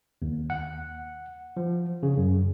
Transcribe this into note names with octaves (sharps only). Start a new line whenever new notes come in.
D#2
F#5
F3
C#3
F#2